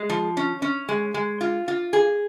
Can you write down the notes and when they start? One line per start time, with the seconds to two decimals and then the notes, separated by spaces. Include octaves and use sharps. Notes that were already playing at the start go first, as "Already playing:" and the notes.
Already playing: G#3
0.10 F3
0.37 C#4
0.62 C#4
0.89 G#3
1.14 G#3
1.41 F4
1.68 F4
1.93 G#4